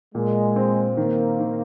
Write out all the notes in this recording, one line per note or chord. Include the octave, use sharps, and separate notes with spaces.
A#2 G#3
C4
D#3 A#3
D#3